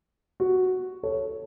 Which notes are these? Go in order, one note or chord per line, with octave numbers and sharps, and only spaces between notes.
F#4
A4 C#5